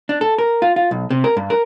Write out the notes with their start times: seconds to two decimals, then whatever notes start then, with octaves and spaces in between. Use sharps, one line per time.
0.09 D4
0.21 A4
0.38 A#4
0.62 F4
0.76 F4
0.91 B1
1.10 C3
1.24 A#4
1.37 G2
1.50 A#4